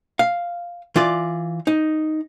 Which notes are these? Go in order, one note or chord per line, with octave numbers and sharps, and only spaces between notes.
F5
E3 F4 D5
D#4